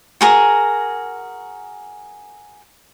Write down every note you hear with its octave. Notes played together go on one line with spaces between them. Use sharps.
F#4 G#4 A#4